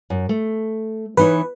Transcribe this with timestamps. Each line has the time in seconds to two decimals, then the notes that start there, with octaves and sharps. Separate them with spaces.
0.10 F#2
0.29 A3
1.17 E3 D#4 B4 C#5